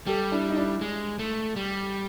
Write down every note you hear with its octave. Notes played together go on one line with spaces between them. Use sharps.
G3 G4 A4
D4 E4
D#4
D4 E4
G#3
A3
G3